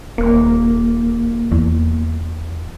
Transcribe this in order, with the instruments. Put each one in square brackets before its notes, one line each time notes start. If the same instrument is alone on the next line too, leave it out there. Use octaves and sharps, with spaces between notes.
[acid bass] D#1 [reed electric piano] A#3
[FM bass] E2